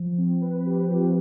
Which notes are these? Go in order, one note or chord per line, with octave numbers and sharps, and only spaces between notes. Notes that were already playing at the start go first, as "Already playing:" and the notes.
Already playing: F3
C4
B4
G4
F3